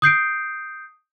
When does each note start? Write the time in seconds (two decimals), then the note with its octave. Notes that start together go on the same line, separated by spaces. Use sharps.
0.02 D#6 G6 C7 D7